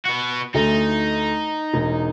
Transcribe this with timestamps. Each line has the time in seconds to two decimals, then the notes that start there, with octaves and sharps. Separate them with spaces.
0.05 B3 F#4
0.54 D2 A3 D#4
1.74 E1